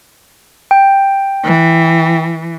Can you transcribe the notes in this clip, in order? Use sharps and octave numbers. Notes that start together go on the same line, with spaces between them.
G5
E3